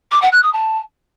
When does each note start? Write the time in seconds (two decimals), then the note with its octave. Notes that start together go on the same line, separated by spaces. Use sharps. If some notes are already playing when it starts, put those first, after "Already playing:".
0.11 D6
0.21 F#5
0.32 F#6
0.42 D#6
0.52 A5